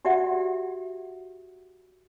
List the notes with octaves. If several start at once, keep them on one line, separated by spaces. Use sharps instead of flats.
F#4 G4 D5 E5 F#5